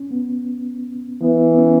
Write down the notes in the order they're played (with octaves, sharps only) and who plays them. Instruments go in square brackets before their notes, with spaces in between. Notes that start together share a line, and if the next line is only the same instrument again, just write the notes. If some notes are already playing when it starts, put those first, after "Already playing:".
Already playing: [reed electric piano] C#4
B3
[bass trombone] E3 [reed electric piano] B3
[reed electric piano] B3
C#4